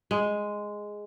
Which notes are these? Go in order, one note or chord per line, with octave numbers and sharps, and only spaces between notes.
G#3